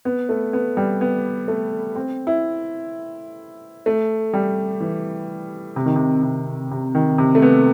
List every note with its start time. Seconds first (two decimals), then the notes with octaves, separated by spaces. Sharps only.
0.05 B3
0.29 A3
0.53 B3
0.77 G3
1.01 B3
1.48 A3
1.95 C4
2.27 E4
3.86 A3
4.34 G3
4.80 E3
5.76 C3
5.86 D#3
5.96 C3
6.23 C3
6.71 C3
6.95 D#3
7.18 C3
7.35 A3
7.42 B3